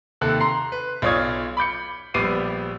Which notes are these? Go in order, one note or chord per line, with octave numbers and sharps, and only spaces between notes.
D#2 C3 A4 F#6
A#5 C6 C7
B4
B1 F4 C#5 D5 D#6 G#6
B5 D6 G6 C#7
A#1 G3 B3 D6 C7 D#7